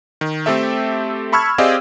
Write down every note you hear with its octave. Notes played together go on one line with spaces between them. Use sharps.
D#3
A3 C4 G4 A4 E5
A5 B5 C#6 E6 F6 G#6
C4 G4 G#4 D5 D#5 F5